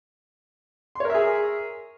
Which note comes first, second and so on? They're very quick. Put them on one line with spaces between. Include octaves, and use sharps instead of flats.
C6 C#5 A#4 E5 G#4